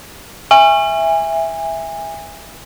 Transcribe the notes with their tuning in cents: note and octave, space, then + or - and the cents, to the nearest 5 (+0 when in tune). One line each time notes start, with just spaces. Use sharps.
E5 +0 G#5 -25